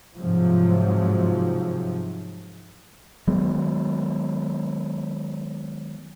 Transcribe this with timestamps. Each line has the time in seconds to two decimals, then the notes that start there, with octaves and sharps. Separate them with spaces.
0.16 G#2 C3 F3 F#3
3.27 D#3 F#3 G#3 B3